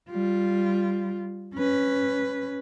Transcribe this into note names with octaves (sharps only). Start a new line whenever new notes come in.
G3 F4
C#4 B4